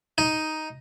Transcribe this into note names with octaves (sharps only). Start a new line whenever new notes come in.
D#4